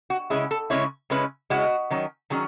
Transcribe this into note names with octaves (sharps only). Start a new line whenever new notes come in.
F#4
C#3 G#3 C#4 E4 G#4
A4
C#3 G#3 C#4 E4 C#5
C#3 G#3 C#4 E4 B4
C#3 G#3 C#4 E4 F#4
D#3 F#3 C#4
D#3 F#3 C#4 G#4